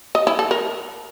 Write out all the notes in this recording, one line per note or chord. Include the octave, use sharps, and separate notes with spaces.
D#5
E4
A4
A#4